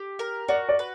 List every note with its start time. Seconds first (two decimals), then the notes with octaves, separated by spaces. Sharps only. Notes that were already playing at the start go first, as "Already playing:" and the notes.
Already playing: G4
0.19 A#4
0.48 F#4 D5
0.69 D5
0.79 B4